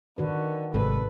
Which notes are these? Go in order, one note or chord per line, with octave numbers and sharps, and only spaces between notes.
D3 D#3 F#4 B4
G#1 G#2 C3 A4 B4